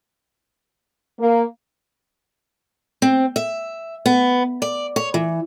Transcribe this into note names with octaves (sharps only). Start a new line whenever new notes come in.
A#3
C4
E5
B3
D5
C#5
E3